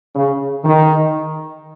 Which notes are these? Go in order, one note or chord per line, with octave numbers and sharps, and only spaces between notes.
C#3
D#3